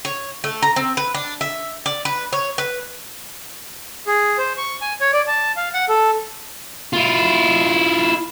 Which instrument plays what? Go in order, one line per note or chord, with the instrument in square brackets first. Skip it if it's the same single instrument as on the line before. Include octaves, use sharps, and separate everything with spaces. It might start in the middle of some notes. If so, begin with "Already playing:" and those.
[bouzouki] C#5
A3
A#5
C4
B4
D4
E5
D5
B4
C#5
B4
[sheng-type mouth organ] G#4
C5
C#6
G#5
C#5
D5
A5
F5
F#5
A4
[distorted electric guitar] E4 F4